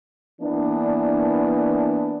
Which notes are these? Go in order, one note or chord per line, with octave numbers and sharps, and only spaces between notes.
E3 A#3 B3 D4